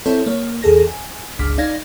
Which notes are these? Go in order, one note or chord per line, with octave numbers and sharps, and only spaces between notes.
C4 E4 A4 C5 C#5
A#3 C#5
E2 G#4 A4 A#6
G#5
G1 C#2 D6 F6 B6
D#4 D5 F5 G#6 A#6